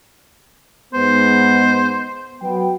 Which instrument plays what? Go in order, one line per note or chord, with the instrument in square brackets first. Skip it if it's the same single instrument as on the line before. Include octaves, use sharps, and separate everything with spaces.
[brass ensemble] G#2 G#3 B3 [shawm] C5
[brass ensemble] F#3 B3 G5